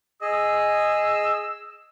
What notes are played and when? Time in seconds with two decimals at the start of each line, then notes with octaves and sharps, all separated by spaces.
0.22 G#4 D#5 E6